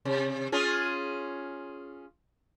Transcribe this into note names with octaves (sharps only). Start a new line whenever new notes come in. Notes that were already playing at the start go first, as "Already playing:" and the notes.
C3
C#4 F4 G#4